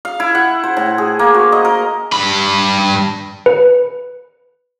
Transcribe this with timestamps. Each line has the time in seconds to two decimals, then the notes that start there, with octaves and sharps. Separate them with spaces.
0.05 F5
0.20 E4
0.35 F#5
0.63 C5
0.77 A2
0.98 G#4
1.19 A#3
1.34 F#4
1.52 D#5
1.65 A#4
2.13 G2 B5
3.46 B4